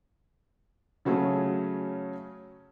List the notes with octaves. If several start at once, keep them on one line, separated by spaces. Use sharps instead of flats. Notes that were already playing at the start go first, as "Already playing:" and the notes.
C#3 F#3 A3 C#4 G#4